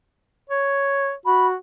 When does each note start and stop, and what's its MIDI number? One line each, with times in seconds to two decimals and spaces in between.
0.50 1.13 73
1.26 1.55 66
1.26 1.47 83